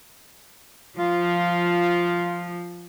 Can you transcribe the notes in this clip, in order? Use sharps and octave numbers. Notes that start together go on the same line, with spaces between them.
F3 F4